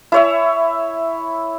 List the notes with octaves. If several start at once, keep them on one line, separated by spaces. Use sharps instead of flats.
E4 C#5 E5